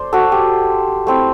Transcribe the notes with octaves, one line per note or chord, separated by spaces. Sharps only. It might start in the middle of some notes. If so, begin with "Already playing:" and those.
Already playing: A3 C5 D5
F#4 A4
G4
A3 C4 E4